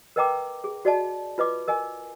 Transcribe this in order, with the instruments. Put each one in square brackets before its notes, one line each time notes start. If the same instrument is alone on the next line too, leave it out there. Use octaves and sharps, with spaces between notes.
[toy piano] A#4 B4 D#5 G5 A#5 D6
G#4
F#4 D5 D#5 A5
F4 B4 D#5 D6
A#4 D#5 G#5